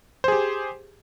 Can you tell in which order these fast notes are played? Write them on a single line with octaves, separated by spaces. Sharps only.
C5 G#4 G4